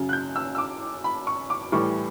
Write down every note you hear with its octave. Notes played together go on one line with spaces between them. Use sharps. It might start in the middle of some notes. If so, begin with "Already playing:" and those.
Already playing: F#2 C#3 F#3
F#6
G6
E6
E6
D6
B5
C#6
D6
A2 E3 G3 C#6